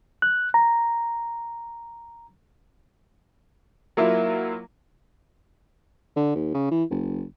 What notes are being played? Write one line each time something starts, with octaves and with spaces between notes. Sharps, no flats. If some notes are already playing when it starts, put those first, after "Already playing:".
F#6
A#5
F#3 A#3 E4 F4
D3
D#2
C#3
E3
F#1